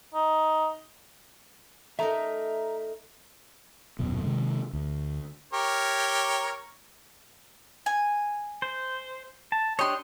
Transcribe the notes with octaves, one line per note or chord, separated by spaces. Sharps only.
D#4
A3 D#4 A#4 E5 A#5
D#1 F#2 B2
C3 D#3 G#3
D2
G4 A#4 C#5
G#5
C5
A5
D4 G4 C#5 D#5 C6